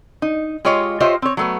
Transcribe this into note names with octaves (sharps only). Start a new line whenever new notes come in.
D#4
G#3 F4 G4 C#5 D#5
F4 G4 C5 C#5 D#5 E5
C4 C#5
F#3 A3 B3